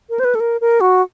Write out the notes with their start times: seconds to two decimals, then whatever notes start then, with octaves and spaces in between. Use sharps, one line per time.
0.10 A#4
0.20 C5
0.25 B4
0.35 A4
0.40 A#4
0.61 A#4
0.81 F#4